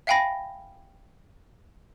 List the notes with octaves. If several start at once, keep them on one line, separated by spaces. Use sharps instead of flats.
E5 F5 G5 G#5 B5 A#6